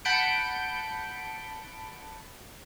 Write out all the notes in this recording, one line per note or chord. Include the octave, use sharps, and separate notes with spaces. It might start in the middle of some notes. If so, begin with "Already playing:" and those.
F#5 A5 B5 G6 C#7 D7